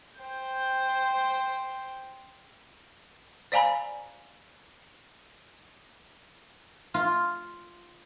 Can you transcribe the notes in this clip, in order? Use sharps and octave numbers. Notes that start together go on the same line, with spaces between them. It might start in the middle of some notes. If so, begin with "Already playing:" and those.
C5 G5
C5 D5 F5 G#5 A#5 B5
F4